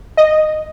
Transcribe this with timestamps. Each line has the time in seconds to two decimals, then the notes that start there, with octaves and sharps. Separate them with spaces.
0.17 D#5